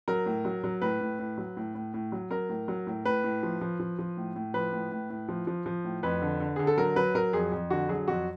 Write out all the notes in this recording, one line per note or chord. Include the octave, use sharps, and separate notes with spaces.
F#3 A#4
A2
F#3
F#3
A2 B4
A2
A2
F#3
A2
A2
A2
F#3
F#3 A#4
A2
F#3
A2
A2 B4
A2
F3
F3
F3
F3
A2
A2
F3 B4
A2
A2
A2
F3
F3
F3
A2
F2 B4
D3
D3
D3 G#4
A4
F#3 A#4
F#3 B4
F#3 A#4
F2 G#4
F2
D3 F#4
F#3 G#4
F2 F#4